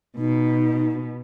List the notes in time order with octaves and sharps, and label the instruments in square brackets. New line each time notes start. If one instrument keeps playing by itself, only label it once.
[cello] B2 [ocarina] D#4